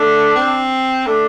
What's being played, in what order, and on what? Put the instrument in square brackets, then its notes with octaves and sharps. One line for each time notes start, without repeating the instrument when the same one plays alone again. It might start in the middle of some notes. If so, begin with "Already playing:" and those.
Already playing: [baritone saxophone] A3 [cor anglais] D4
[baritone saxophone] C4
[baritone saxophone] A3 [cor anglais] D4